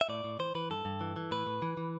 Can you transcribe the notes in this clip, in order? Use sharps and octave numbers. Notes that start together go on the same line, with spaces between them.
E5
A2 D5
A2
E3 C5
E3 B4
G2 A4
G2
E3
E3
A2 B4
A2
E3
E3